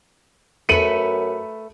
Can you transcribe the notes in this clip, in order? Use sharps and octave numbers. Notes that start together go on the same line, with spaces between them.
F#2 A3 B4 C#7 D#7 F#7